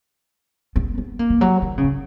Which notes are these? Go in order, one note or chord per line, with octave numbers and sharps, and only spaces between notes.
B3
B3
A#3
E3
F#3
D#3
C#3
D#3